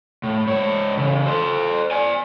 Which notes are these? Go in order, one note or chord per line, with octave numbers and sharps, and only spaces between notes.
A2
G#2 C#5
C#3 E3
A4 C5
D5 G#5